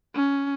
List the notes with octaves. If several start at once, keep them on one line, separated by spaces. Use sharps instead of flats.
C#4